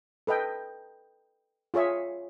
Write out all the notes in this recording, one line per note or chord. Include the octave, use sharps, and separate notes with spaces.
A4 B4 D#5 G5
F4 G#4 C#5 E5